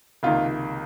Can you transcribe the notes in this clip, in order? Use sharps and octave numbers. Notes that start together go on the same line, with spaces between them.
C#2 C3 D#3 A#3 F4